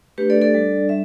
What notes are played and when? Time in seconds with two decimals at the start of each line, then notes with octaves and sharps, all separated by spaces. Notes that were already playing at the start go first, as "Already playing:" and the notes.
0.18 A3 D4 G4 B4
0.30 A4 D5
0.41 A4 D5
0.54 G3 D4
0.89 G3 E5